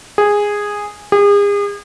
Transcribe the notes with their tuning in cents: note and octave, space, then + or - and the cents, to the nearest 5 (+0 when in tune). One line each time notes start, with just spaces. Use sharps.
G#4 -10
G#4 -40